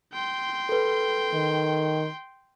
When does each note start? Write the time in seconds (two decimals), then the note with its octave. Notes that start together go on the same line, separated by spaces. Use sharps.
0.13 G5 C6
0.69 A4 B4
1.34 D#3